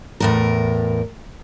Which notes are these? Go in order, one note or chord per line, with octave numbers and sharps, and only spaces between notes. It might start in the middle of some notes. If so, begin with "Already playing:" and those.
E2 A2 A#4